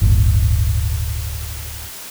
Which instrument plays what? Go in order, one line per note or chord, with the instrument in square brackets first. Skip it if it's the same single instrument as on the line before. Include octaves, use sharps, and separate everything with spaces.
[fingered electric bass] D1 G1